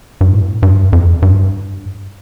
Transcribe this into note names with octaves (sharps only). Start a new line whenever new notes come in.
G2
A2
G2
F2
G2